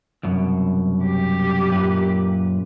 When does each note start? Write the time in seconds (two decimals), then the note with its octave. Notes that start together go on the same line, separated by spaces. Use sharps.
0.23 C2 F#2 B2
1.03 G4
1.68 F#2 A#2 B4